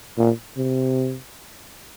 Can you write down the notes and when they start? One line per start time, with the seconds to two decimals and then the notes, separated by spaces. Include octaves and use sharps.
0.18 A#2
0.57 C3